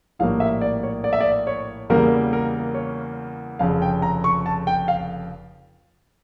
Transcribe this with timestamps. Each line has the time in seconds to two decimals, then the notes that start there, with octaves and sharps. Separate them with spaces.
0.19 A#1 A2 G3 A#3 F5
0.40 E5
0.61 D5
0.83 C#5
1.04 D5
1.13 E5
1.20 D5
1.47 C#5
1.90 E2 C#3 G3 A#3 A#4
2.33 A#4
2.74 C#5
3.59 F1 F2 C#3 F5
3.82 G5
4.02 A#5
4.24 C#6
4.46 A5
4.67 G5
4.88 F5